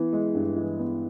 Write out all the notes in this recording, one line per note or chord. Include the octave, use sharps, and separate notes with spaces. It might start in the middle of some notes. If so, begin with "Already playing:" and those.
Already playing: E3 B3
G#3
G2
E3
B3